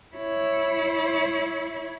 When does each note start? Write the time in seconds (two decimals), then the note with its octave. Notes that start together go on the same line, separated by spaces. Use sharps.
0.16 E4 C#5